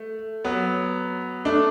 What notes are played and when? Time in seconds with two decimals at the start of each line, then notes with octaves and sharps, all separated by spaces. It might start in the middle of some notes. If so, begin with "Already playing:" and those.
Already playing: A3
0.44 F#3 B3
1.45 A3 D4